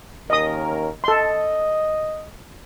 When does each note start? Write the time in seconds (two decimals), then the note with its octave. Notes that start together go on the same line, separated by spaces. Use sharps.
0.30 D#2 C#4 A#4 D#5 D#6
1.04 A4 D#5 C6